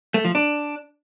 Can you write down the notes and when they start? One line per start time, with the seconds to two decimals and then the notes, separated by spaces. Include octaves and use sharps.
0.14 A3
0.25 F3
0.35 D4